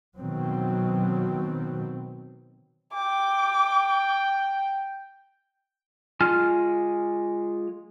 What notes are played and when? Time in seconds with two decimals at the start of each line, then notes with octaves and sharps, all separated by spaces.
0.16 B2 D#3 F#3 C4
2.93 G5 D6
6.21 G#3 F4 G#5 F6